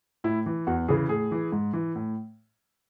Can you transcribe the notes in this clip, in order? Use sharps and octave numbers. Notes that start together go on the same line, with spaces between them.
A2 E4
E3
E2 F#4
C#3 E3 G#4
A2 G#4
E3
G#2
E3
A2